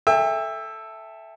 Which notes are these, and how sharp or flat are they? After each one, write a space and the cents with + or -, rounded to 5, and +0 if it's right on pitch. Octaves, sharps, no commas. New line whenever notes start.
A4 +0 E5 +0 G5 +35